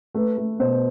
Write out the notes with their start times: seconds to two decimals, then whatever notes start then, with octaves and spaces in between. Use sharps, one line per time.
0.15 A3 B4
0.37 A3
0.59 B2 C5